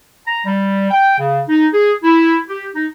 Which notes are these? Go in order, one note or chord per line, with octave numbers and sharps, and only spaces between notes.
A#5
G3
G5
C#3
D#4
G#4
E4
G4
D#4